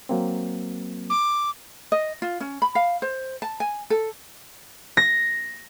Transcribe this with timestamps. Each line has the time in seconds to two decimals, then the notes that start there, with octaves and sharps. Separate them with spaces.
0.09 F#3 A#3 C4
1.10 D6
1.92 D#5
2.22 F4
2.40 C#4
2.62 B5
2.75 F5
3.02 C5
3.42 A5
3.60 G#5
3.90 A4
4.97 A#6